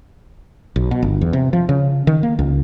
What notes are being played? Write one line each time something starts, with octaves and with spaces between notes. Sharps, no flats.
B1
B2
G1
E2
C3
F3
C#3
D#3
A#3
C#2